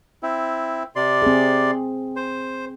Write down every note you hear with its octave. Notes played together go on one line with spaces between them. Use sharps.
C4 E4
C3 D5 C6
C4 G#4
C5